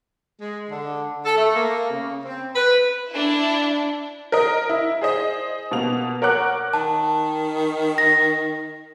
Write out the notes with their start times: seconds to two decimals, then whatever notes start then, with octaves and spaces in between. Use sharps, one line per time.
0.41 G#3
0.71 D3
1.25 A4
1.37 A3
1.54 A#3
1.90 C#3
2.25 C4
2.56 B4
3.11 D4 E4
4.32 A#4 D#5
4.69 E4
5.01 G#4 C5 D#5
5.71 B2 A#3 F7
6.22 A#4 C#5 F#5 D6 F#6
6.73 D#3 A5
7.98 A#6